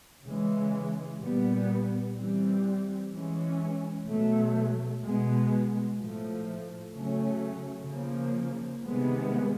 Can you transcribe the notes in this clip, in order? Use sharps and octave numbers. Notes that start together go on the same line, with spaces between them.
C#3 E3 G#3
A#2 G3 B3
E3 G3 C4
E3 G#3 C#4
B2 F#3 A3
B2 G#3 B3
A2 F3 A3
C#3 F#3 A3 C#4
C#3 F3 A#3
C3 D#3 G#3 B3